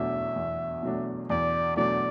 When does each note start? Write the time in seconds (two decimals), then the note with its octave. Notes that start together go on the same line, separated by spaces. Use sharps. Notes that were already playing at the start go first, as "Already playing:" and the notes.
Already playing: E2 B2 F#3 A3 D4 E5
0.36 E2
0.83 B2 F#3 A3 D4
1.30 E2 D5
1.76 B2 F#3 A3 D4 D5